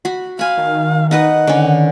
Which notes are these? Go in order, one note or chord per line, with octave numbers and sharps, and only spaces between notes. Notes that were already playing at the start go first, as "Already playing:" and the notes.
F#4 B5
F5 G#5 B5
D#3
D#4 B4 D#5 F#5
D3 C#4